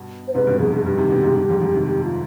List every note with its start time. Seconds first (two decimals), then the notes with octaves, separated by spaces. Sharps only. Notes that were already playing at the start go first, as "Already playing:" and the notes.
Already playing: G2 B2
0.28 C5
0.34 G#2 C3 B4
0.47 G2 B2
0.59 F2 G#2 G#4
0.73 G2 G#4
0.85 G2 G4
0.97 C3 D#3
1.10 B2 D3
1.23 G#2 C3
1.36 G2
1.49 F2 G#2
1.61 F2 G#2
1.74 C3 D#3
1.87 G4
2.04 F4